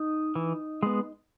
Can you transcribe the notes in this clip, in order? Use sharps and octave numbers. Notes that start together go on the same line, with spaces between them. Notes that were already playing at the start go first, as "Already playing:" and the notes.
Already playing: D#4
E3
G#3 B3